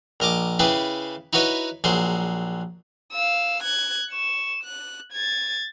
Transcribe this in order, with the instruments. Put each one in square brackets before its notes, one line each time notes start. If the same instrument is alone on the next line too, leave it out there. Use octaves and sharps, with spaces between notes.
[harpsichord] A#1 A#4 D#5 D6
C#3 E4 G4 G#4 B4
D#4 E4 F#4 B4 C#5 D#5
A#1 F#3 G#4 C5
[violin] F5 E6
F#6 G#6
C#6 E7
F#6
G#6 A6